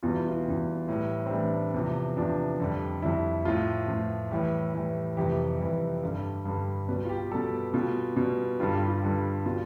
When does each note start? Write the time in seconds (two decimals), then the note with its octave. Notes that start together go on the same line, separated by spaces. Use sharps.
0.03 E2 B2 G3 F4
0.15 E4
0.29 F4
0.45 E2 B2 G3
0.88 A2 E3 G3
1.26 C4
1.31 A2 E3 G3 D4
1.53 D4
1.74 E2 C3 F3
2.17 E2 C3 F3 D4
2.60 F2 D3 G3
3.02 F2 D3 G3 E4
3.45 A2 F3 F4
3.88 A2 F3
4.31 A2 E3 G3 G4
4.74 A2 E3 G3
5.17 F2 C3 E3 G3 G4
5.60 F2 C3 E3 G3
6.03 G2 D3 G3
6.45 G2 D3 G3
6.88 B2 G3 B4
7.05 F4
7.09 G4
7.31 B2 G3 A4
7.74 B2 G3 F4
8.17 B2 G3
8.59 G2 D3 G3 F4
8.73 G4
8.87 F4
9.02 G2 D3 G3
9.46 B2 G3 F4